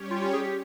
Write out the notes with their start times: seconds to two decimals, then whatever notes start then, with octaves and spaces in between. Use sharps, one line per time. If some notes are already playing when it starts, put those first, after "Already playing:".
Already playing: G3 C#4 G4 C#5
0.11 F4
0.22 F4
0.33 G#4
0.43 G4